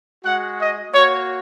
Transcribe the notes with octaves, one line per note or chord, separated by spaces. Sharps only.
G#3 F#4 F#5
D#5
A#3 F#4 C#5